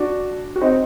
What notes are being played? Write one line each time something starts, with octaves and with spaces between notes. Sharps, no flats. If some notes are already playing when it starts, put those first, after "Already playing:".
Already playing: D4 F#4
F#4
C4 D#4